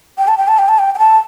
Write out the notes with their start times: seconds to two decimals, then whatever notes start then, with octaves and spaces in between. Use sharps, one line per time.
0.18 G5
0.28 A5
0.38 G5
0.48 A5
0.58 G5
0.69 A5
0.79 G5
0.95 G5
0.99 A5